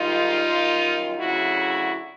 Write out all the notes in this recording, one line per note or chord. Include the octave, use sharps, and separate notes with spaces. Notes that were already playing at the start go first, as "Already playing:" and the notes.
Already playing: G#2 D#3 G3 D#4 F4
F#2 D#3 G3
D2 C#3 F#3 E4 F#4